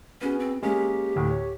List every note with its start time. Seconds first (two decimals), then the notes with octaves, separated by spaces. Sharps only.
0.21 B3 C#4 F#4 G#4
0.40 C4
0.62 G#3 A#3 C#4 G4
1.16 D2 A2
1.30 C#5